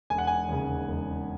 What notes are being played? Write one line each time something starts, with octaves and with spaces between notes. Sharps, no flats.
E1 G#5
F#5
G#5
D#2 C#3
E1